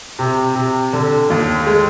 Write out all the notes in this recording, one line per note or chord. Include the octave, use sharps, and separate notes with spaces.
C3
C3
D3
D#2
G#3